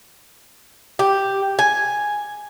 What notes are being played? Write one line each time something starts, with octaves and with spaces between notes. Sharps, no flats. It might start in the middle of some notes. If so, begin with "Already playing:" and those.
G4
G#5